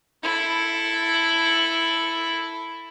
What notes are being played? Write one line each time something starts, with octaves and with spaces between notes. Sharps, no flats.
E4 A4